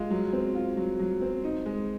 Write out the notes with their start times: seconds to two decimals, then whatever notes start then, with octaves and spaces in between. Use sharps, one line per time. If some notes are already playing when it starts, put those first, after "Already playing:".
Already playing: G#3 F4
0.10 F#3
0.33 C4
0.55 F4
0.77 F#3
0.99 F#3
1.21 C4
1.44 D#4
1.66 G#3